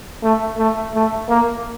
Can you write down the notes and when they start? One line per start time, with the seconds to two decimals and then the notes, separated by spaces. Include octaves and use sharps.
0.23 A3
0.58 A3
0.95 A3
1.29 A#3